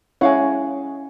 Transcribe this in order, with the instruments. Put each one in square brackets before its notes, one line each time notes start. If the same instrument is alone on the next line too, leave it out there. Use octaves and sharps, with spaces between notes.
[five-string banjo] G#3 F5 F#5 [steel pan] C#4 E4 C#5